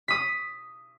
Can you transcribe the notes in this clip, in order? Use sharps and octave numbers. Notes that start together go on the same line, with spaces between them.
D#6 B6